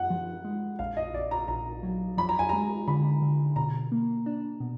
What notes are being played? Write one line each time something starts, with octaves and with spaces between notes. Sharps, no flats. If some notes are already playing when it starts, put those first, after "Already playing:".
Already playing: F#2 F#5
F3
G#3
A#1 F5
D#5
A#1 D5
A#5
A#1 A#5
F#3
F3 B5
A#5
G#5
G#3 A#5
D3 B5
D3
B2 A#5
A#3
D4
B2